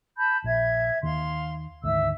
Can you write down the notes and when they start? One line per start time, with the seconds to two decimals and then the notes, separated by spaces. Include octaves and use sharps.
0.16 A5 B5 G6
0.44 A#1 E5 G#6
1.03 D#2 D#3 F5 C6
1.83 D2 G#2 D#3 E5 E6